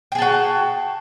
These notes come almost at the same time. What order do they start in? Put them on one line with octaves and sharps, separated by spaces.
G5 G#4 A5 F#4